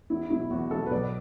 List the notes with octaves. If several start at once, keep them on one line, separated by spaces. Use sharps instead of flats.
E2 E4
B2 F#3 E4
E2 F#4
B2 F#3 A4
B4
B1 D5